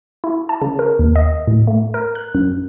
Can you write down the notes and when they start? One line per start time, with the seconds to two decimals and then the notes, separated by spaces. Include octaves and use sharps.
0.24 E4
0.49 A5
0.62 C#3
0.79 A#4
0.99 D#2
1.16 D#5
1.48 A2
1.67 A3
1.94 A#4
2.15 F#6
2.35 F#2